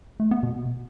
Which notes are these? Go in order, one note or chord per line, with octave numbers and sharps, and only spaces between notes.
A3
B3
B2